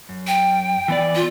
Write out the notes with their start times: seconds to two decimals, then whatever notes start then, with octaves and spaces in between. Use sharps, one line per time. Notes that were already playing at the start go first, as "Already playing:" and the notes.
0.09 F#2
0.27 G5
0.88 E3 B3 D5
1.15 F4